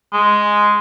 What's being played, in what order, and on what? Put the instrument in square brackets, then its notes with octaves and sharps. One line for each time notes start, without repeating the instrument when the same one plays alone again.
[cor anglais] G#3